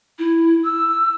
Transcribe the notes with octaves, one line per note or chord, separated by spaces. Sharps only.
E4
E6